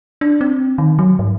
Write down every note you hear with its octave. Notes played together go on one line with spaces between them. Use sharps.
D4
C4
D#3
F#3
G#2